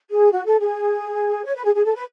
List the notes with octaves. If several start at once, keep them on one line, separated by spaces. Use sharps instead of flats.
G#4
F#4
A4
G#4
C#5
B4
G#4
G#4
A4
B4